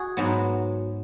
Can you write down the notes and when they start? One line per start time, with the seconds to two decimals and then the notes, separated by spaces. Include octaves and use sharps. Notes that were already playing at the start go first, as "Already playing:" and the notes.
Already playing: F#4 G#4
0.17 G#2 F#3 B3